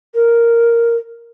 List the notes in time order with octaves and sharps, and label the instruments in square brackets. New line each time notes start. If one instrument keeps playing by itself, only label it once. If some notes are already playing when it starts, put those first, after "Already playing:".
[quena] A#4